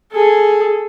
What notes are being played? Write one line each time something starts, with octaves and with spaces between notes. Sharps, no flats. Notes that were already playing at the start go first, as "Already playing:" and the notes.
G#4 A4